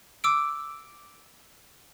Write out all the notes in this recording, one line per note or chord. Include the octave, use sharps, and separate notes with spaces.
D6 E6 D7